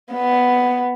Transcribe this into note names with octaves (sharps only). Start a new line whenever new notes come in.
B3